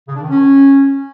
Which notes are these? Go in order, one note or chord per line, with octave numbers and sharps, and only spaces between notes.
C#3
D4
D#3
C#4